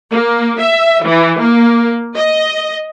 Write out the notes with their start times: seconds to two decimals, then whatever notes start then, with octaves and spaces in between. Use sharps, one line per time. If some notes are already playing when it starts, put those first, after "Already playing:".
0.12 A#3
0.60 E5
1.05 E3
1.41 A#3
2.16 D#5